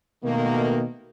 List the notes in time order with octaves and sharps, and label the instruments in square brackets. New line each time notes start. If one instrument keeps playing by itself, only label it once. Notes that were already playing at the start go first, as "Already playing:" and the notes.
[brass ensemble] B2 D#3 A3 A#3